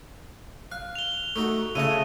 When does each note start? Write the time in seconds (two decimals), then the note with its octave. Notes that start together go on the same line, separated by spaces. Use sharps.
0.72 F5 F#6
0.95 F7 G7
1.36 A3 D#4 F#4
1.75 C#3 A3 E4 C#5 D#5 D#7